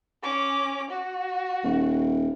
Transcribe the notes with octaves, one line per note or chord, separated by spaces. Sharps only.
C#4 D6
F#4
D#1